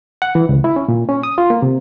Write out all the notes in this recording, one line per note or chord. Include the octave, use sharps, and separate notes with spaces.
F#5
E3
C#2
E4
C#4
A#2
C#4
D#6
F4
A#3
C3